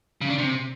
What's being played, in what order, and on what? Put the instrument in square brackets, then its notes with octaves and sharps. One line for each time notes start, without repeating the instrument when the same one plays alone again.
[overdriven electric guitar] C#3
D4
C3